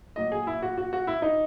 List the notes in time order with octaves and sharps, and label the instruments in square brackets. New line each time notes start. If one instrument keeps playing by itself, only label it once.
[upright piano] A#2 F#3 D#5
G#4
E4
F#4
F#4
F#4
E4
D#4